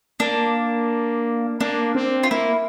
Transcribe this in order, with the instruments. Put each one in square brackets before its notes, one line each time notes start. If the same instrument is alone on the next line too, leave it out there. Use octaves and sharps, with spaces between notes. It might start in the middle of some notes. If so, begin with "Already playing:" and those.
[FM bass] A#3 [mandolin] D4
[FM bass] A#3 [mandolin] D4
[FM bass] C4
[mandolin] F4
[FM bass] A#3 [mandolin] E4